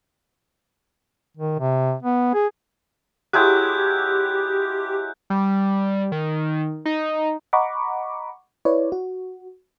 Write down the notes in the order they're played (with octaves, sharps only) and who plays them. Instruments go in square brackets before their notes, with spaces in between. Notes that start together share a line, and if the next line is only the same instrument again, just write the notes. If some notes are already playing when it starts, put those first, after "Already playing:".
[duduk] D#3
C3
B3
G#4
[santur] F#3 G#3 E4 [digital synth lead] G4 [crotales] F#6 G6
[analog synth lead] G3
D#3
D#4
[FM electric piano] D#5 F#5 A#5 B5 C#6 D6
E4 B4 C#5 D5
F#4